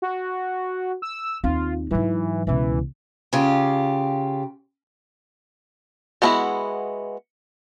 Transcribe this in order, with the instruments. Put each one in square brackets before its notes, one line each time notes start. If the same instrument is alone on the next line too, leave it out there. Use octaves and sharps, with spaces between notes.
[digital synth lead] F#4
E6
[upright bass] D#2 C4 [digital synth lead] F4
[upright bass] G#2 F#3 [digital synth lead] E3
[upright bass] C#2 B2 [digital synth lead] E3
[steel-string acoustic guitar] C#3 F4 G4
[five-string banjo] G#3 B3 D4 E4 F#4